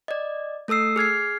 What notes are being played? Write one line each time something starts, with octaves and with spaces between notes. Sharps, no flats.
D5 D#5
A3 A4 D#6 E6 C7
G#4 F6 G#6 C7